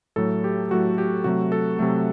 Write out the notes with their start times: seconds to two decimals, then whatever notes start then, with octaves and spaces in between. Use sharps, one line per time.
0.16 A2 F#3 A3 A4
0.44 G4
0.70 A2 F#3 A3 F#4
0.98 G4
1.24 C3 F#3 A3 F#4
1.52 A4
1.79 C3 F#3 A3